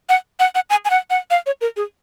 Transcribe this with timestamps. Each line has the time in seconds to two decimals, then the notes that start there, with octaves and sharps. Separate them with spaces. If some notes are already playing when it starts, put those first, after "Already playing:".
0.09 F#5
0.40 F#5
0.55 F#5
0.70 G#5
0.85 G#5
0.90 F#5
1.10 F#5
1.31 F5
1.46 C#5
1.61 A#4
1.76 G#4